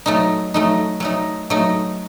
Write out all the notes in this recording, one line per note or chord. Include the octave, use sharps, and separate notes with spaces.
F#3 A3 D#4
F#3 A3 D#4
F#3 A3 D#4
F#3 A3 D#4